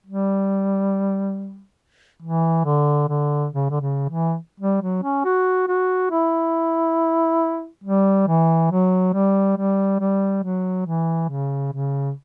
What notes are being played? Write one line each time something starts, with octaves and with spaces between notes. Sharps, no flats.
G3
E3
D3
D3
C#3
D3
C#3
E3
G3
F#3
C#4
F#4
F#4
E4
G3
E3
F#3
G3
G3
G3
F#3
E3
C#3
C#3